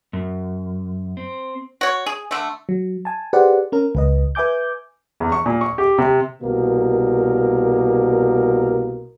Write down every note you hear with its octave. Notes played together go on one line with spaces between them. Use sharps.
F#2
C4
F#4 C#5
G#4
D3 A3
F#3
G#5 A5
G4 G#4 B4 C5 D5 F#5
C#4 A#4
C#2 B4 D#5
B4 E5 G#5 D6 G6
E2
C#6
A#2
C#6
G4
C3
C2 B2 A#3 A#4